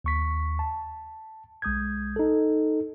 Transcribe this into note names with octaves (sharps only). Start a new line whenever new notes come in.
D#2 C#6 B6
A5
B1 G#3 D#6 G6 G#6
D#4 A4